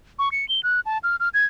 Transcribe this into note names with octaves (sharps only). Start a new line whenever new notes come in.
C#6
C#7
G7
F#6
A5
F6
F6
G#6